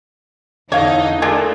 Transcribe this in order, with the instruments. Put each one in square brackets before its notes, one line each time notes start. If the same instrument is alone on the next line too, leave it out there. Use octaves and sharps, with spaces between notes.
[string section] E2 D#4 [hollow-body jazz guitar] D3 F5 [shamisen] C#5
[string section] A3 [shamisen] D4 F4 G#4 [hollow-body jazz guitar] A#4